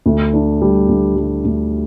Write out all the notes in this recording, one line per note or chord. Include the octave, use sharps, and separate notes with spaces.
D2
D4
G3
D2
G3
D2